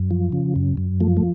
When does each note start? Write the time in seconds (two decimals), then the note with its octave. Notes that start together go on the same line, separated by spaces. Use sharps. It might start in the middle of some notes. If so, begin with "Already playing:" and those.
Already playing: F#2
0.11 F3
0.32 C#3
0.56 F#2
0.77 F#2
1.01 F3 A3
1.17 A3